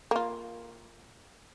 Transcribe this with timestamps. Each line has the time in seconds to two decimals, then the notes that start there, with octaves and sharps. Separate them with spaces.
0.11 A#3 F4